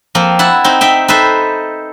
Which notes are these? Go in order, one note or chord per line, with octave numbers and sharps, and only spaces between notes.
F3 A#3 C4
E4 F#5 A5
C4 D#4
D#4 E5 G5
D#4 A4 B4 C5 E5